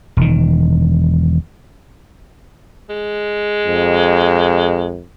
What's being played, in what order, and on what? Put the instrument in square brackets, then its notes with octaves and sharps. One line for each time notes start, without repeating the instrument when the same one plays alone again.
[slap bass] E1 D#3
[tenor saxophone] G#3
[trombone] F2